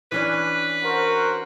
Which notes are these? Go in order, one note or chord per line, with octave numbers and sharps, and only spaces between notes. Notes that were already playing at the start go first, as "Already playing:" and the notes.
E3 C#4 D4 B4
F#4 A#4 C5